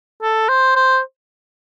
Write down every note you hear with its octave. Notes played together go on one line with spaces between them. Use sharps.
A4
C5
C5